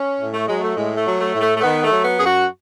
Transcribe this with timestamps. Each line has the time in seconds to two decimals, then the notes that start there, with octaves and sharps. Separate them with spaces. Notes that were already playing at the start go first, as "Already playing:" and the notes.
Already playing: C#4
0.20 A2
0.34 A3
0.47 F#3 G#3
0.61 A3
0.76 A2 G#3
0.97 A3
1.05 F#3
1.19 A3
1.34 A2
1.41 A3
1.57 A3
1.62 D#3 B3
1.84 A3
1.90 F#3
2.05 B3
2.19 F#2 G#4
2.26 F#4